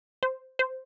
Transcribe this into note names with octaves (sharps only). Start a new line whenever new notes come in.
C5
C5